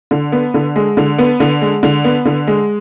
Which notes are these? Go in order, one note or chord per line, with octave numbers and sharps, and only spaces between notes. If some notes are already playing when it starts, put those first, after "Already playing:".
D3
B3
D3
G#3
D3
B3
D3
G#3
D3
B3
D3
G#3